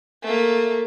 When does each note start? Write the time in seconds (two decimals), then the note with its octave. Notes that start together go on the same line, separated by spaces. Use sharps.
0.23 A3 A#3